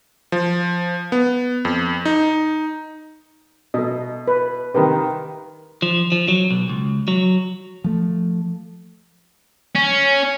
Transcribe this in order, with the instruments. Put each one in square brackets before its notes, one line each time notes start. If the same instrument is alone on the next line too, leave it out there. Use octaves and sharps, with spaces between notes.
[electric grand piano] F3
B3
F2
D#4
[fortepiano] B2 [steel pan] A4 D#5
[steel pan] B4
[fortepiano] C3 D#3 [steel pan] A#4 B4
[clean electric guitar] F3
F3
F#3
B1
C#2
F#3
[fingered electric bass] F3 A3
[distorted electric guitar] C#4